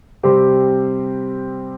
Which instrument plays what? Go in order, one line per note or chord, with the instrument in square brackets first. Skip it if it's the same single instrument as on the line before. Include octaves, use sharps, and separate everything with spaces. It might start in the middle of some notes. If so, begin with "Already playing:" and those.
[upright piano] C3 G3 C4 G4 C5